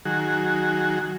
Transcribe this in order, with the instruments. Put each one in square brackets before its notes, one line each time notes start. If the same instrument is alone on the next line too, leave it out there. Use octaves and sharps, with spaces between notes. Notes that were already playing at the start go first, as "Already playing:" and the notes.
[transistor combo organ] D#3 F#3 F#4 G#4